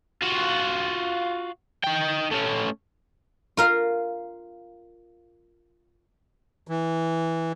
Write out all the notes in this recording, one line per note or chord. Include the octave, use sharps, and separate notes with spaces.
F4 F#4
D#4 G5
A3 C#4
F4 A#4 F5
E3